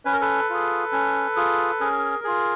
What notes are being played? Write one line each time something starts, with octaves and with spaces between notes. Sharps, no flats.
C#4 B4
A#4
A4 B4
F4 G#4
C#4
F4 G#4
C#4 G#4 A#4
F4 G#4